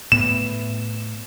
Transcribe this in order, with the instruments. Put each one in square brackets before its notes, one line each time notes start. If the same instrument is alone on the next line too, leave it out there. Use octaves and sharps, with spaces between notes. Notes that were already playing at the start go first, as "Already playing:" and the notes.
[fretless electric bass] A2 B3 [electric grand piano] E7